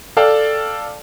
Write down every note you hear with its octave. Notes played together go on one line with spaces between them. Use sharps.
A4 D5 F5 G5 A5